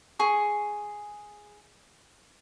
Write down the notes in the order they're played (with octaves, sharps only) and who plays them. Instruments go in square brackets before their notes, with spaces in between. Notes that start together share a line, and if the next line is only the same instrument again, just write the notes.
[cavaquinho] G#4 C#6